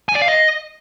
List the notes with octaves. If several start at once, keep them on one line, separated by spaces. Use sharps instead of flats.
G#5
D5
F5
D#5